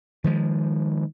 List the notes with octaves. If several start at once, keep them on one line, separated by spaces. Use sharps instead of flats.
D#3 F3 G#3